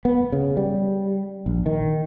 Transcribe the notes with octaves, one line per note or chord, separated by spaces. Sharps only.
B3
C#3
G3
A#1
D#3